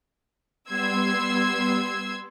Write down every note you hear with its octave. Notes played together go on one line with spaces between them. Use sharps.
G3 B3 C6 E6 G#6